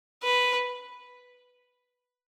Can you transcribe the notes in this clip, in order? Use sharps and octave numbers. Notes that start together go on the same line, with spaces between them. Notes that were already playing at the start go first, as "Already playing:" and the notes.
B4